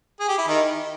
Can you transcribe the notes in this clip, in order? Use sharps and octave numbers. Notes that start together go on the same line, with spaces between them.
G#4
G4
E4
D#3 D#4